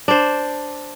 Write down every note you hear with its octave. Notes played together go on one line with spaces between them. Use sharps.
D4 C5